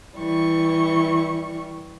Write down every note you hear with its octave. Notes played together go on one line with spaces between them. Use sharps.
E3 G3 C#6